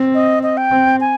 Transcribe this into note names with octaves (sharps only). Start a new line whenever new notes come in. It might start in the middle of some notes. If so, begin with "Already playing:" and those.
Already playing: C4
D#5
D#5
G5
C4
G#5